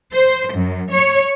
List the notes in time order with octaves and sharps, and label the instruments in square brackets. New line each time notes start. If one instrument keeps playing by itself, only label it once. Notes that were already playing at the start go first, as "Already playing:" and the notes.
[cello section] C5
F#2
C#5